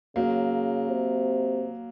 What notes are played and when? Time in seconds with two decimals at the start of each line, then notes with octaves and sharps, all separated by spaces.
0.16 C#3 F#3 A#3
0.90 C3